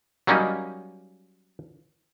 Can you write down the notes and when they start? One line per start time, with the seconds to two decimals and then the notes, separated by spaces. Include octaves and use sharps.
0.27 F#3 G3 A#3 C#4 D#4